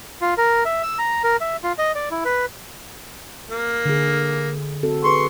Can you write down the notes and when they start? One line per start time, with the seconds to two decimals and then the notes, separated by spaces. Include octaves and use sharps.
0.21 F4
0.37 A#4
0.65 E5
0.83 E6
0.98 A#5
1.24 A#4
1.41 E5
1.63 F4
1.78 D#5
1.95 D5
2.11 E4
2.25 B4
3.50 A#3
3.85 D3 G#4
4.83 C4 F#4 A4
5.04 G#4 B4 C6 C#6